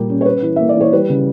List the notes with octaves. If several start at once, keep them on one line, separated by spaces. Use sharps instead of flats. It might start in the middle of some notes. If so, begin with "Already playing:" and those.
Already playing: A#2 G3 A#3 G4 A#4
C#4
C#5
C#4 B4
E3
A#3 E5
D5
E3 C#5
G3 B4
C#3